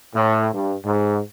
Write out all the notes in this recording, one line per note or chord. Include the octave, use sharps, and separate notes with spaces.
A2
G2
G#2